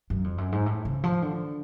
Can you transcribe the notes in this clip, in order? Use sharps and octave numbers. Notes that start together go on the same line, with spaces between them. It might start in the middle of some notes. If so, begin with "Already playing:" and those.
F#2
F2
F#2
G#2
A2
C#3
F3
D3